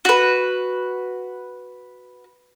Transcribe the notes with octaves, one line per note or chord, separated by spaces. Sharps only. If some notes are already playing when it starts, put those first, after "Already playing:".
F#4 B4